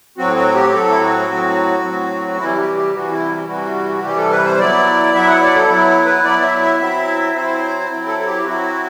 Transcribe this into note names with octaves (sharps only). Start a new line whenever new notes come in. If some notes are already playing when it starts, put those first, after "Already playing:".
A2 F#3 C4 F#4
F#4
G4
A2 F#3 C4 A4
E4
F#4
A2 F#3 C4
A2 F#3 C4
C3 E3 G3 E4
G4
G4
C3 E3 G3 F#4
E4
C3 E3 G3 F#4
C3 E3 G3 G4
A4
B4
C5
F#3 B3 E4 D5
F#3 B3 E4 E5
F#5
D5
A4
F#3 B3 E4
B4
F#3 B3 E4 D5
E5
E5
F#3 C4 E4 E5
F#3 C4 E4 C5
F#3 C4 E4
A4
A4
G4
F#3 C4 E4 F#4